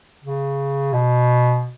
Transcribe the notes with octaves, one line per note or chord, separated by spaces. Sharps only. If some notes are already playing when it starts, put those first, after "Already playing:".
C#3
B2